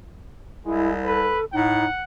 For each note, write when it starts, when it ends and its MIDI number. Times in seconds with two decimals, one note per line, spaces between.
0.65 1.34 36
0.65 0.96 56
0.65 0.92 64
1.05 1.45 69
1.05 1.39 71
1.53 1.86 45
1.53 1.86 63
1.53 2.03 78